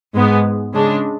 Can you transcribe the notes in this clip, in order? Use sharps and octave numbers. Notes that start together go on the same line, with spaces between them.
G#2 G#3 B3
C#3 G#3 D4